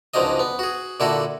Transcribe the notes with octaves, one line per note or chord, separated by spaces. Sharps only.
C#2 G#2 F3 F#3 D4 D#5
B3
F#4 G#4
A#2 D3 E4 F#4 A4